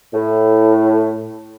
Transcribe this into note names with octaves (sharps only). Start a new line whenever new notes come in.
A2